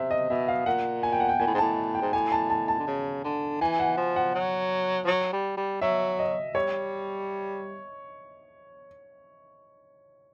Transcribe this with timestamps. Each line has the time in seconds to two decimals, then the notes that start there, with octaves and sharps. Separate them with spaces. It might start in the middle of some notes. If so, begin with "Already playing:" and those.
Already playing: C3 E5
0.11 D#5
0.30 B2 E5
0.48 F5
0.66 A#2 F#5
1.03 G#5
1.12 G5
1.20 F#5
1.29 G5
1.40 A#2 G#5
1.47 A2
1.54 G#2
1.58 A2 A5
1.95 G5
2.01 G#2
2.13 A2 G#5
2.32 A5
2.50 A5
2.68 A5
2.79 D3
2.87 C#3
3.24 D3
3.61 E3 G#5
3.79 F#5
3.97 F3
4.16 F#5
4.35 F#3
5.04 F3
5.07 F#3
5.33 G3
5.57 G3
5.81 F#3 E5
6.19 D#5
6.55 G3 C#5